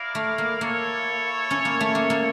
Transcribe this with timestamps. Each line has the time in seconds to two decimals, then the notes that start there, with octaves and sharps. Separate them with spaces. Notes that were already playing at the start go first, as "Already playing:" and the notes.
Already playing: E4 A#4 D5 F5
0.15 A3
0.38 A#3
0.60 A#3 E4 A4 C#5
1.51 C#4
1.65 A#3
1.81 A3
1.95 A#3
2.10 A#3